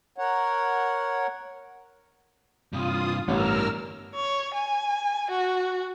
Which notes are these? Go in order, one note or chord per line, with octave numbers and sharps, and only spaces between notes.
A#4 C#5 F#5
G2 C3 F4 D#6
A1 G2 B3 A#4 E6 F6
C#5
G#5
F#4